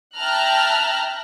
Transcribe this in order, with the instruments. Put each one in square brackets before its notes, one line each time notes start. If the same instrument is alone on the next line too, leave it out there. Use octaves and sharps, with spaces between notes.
[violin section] E5 G5 A5 A#5 F6 F#6